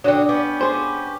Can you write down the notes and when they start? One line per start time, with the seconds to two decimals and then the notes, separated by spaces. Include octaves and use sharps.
0.04 D3 F#3 D4 F#4 G5 D#6
0.29 B3 C#4 G4
0.61 G#4 C5